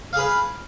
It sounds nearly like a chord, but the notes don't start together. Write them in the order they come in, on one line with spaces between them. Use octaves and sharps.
F5 G#4 B4